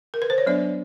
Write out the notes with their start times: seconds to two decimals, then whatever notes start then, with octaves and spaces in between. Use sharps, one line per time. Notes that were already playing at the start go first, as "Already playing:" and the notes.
0.14 A#4
0.22 B4
0.30 C5
0.38 C#5
0.46 F#3 B3 D4 D5